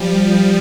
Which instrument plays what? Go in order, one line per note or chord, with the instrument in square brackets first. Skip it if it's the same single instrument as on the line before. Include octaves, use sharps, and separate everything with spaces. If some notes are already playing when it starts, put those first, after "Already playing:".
Already playing: [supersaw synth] F3 G3